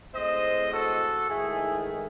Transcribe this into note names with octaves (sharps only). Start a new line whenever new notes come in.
A2 G#3 C4 C5 D#5
F#4 A4
G#2 D#3 A3 E4 G#4